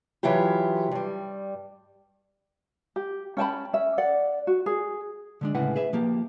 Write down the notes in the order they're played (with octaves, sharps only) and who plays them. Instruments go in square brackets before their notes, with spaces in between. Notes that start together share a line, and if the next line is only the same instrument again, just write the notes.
[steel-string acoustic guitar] E3 F#3 E4 F4 G4
G2 G3
[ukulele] G4
C#4 G5 A5 B5
C#4 E5
D5 F#5
F#4
G#4
[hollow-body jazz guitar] D3 G#3 D4
A2 C#3 G#3 E4 B4 F#5
G#4 B4 E5
F3 A#3 G4